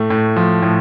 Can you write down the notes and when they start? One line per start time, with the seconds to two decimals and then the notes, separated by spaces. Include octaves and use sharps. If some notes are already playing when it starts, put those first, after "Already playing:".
Already playing: A2 A3
0.10 A2
0.36 F3
0.62 A2